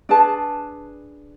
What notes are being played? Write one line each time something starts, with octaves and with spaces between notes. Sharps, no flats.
D4 G#4 B4 A5